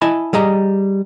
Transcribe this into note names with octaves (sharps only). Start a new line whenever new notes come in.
E4 D#5 G#5 A5 B5
G3 G#4 D#5 A#5